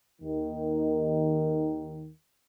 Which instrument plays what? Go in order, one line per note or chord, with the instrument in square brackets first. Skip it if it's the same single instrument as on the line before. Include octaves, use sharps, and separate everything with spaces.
[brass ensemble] D#2 D#3